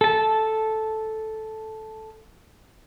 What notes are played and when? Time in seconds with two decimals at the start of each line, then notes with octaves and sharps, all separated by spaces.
0.01 A4 A5